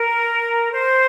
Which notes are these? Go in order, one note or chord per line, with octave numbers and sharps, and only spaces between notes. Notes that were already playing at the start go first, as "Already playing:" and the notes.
Already playing: A#4
C5